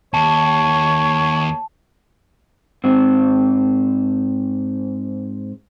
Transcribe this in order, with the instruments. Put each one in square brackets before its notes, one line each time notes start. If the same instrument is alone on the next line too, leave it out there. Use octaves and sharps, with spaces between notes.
[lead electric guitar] D#2 [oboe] C#5 [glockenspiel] A5
[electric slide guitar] G#2 C4